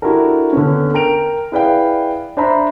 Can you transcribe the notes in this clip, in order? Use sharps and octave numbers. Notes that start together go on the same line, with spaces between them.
D4 E4 F#4 G4 A4 A#4
D3 B3 C#4
A#4 G5 D7 F7
E4 G#4 B4 D5 F5 G5
D4 C5 E5 A#5 B5